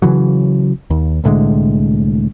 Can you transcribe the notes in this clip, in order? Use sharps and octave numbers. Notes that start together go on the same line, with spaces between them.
C#3 E3 F#3
D#2
C2 A2 D3 G#3